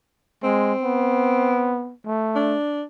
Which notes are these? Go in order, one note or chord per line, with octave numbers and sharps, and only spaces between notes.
G#3 C4
B3
A3
D4